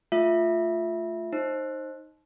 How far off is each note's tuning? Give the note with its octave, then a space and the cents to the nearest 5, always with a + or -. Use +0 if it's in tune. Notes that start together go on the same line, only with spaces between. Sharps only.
A3 +0 F4 +0 E5 +0
D#4 +0 C5 +20